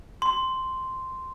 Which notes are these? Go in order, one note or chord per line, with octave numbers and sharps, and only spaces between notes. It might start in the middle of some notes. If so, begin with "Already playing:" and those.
C6